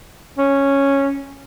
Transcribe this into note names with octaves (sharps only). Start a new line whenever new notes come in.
C#4